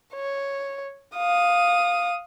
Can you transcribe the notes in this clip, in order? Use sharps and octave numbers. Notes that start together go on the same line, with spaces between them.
C#5
F5 D#6